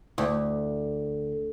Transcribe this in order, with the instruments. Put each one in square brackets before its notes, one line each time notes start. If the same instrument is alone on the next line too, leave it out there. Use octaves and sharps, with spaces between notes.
[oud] D2